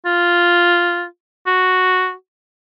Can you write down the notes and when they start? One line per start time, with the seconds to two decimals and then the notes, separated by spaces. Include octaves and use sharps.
0.06 F4
1.47 F#4